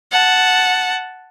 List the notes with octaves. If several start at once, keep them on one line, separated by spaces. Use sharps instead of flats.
F#5 A5